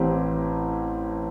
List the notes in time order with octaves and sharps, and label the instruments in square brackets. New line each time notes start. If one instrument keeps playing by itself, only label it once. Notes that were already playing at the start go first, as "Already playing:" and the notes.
Already playing: [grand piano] A1 A2 C4 G4